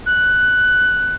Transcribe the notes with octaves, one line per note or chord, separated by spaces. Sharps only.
F#6